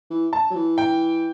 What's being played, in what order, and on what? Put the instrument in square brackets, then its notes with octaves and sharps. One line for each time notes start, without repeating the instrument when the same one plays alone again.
[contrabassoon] E3
[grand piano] A5
[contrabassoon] F#3
E3
[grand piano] G5